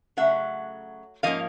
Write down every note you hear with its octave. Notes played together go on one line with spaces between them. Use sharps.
C#3 F#3 A3 E5 F#5
G#2 F3 A#3 C#4 D#5 F5